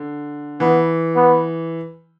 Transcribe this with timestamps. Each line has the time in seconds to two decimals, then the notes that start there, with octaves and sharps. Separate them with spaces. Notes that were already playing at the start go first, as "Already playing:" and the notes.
Already playing: D3
0.60 E3 B3
1.16 B3